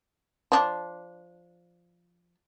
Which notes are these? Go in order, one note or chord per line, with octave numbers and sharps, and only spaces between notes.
F3 D4